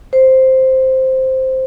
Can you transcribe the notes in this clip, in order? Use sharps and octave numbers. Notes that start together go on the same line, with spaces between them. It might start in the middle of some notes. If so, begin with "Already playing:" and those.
C5